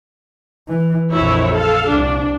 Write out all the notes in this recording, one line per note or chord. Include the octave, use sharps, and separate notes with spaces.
E3
A#1 F2 E4 C#5
A4 F5
C2 D4